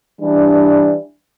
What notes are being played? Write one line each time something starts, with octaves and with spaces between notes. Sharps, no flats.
E3 G3 D4